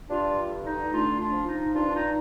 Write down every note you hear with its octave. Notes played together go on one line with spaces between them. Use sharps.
G2 D4 F4
D3
D#4
A3 D4 F4
D4 F4
F3
D#4
G2 D4 F4
D4
D#4